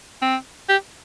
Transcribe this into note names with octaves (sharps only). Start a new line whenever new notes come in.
C4
G4